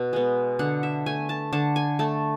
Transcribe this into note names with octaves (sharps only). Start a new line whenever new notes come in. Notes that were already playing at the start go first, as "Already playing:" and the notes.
Already playing: B2
G#3 B3
D3 F#5
E5
A3 G#5
A5
D3 A5
G#5
A3 A5